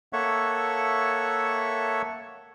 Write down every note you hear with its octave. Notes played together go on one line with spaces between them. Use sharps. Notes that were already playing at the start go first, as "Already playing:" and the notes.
A#3 A4 C#5 E5 F#5 C#6